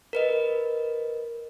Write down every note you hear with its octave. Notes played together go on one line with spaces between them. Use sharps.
A#4 B4 D#5